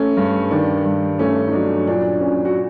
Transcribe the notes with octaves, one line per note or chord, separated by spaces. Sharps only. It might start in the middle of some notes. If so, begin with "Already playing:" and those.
Already playing: A3 C#4
G2
D#3 D4
G2
A3 C#4
D#4
F#3 D4
A#2 D4
A#2 C#4
F#4